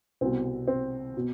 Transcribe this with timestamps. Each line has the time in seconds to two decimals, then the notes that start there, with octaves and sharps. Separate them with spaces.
0.21 C2 B2 C4
0.67 C4
1.17 B2